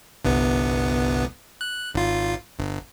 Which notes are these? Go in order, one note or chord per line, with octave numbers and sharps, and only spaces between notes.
G1 C2 B3
F#6
G#1 F4
G1